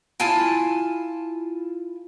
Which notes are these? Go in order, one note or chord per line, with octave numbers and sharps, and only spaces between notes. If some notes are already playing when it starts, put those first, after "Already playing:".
E4 F4 G#5 A5